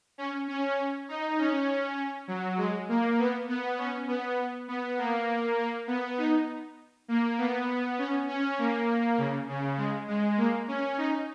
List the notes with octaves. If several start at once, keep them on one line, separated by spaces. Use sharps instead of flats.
C#4
C#4
D#4
C#4
F#3
G#3
A#3
B3
B3
C#4
B3
B3
A#3
A#3
B3
D#4
A#3
B3
C#4
C#4
A#3
C#3
C#3
G#3
G#3
A#3
C#4
D#4